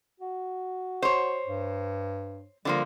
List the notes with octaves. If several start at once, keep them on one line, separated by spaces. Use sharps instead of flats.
F#4
C5 C#5
G2
D3 F3 G3 A#3